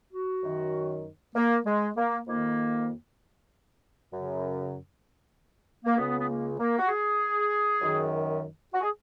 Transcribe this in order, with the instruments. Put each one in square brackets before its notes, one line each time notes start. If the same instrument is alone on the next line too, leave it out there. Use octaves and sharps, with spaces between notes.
[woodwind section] F#4
F#2 D#3
A#3
G#3
A#3
F2 D#3 A#3
F#2 C#3
A#3
C#2 C#3 B3
B3
A#3
A#3
F#4
G#4
F#2 D#3
F#4
G#4